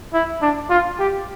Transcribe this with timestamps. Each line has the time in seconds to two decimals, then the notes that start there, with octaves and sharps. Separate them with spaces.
0.14 E4
0.41 D4
0.70 F4
0.99 G4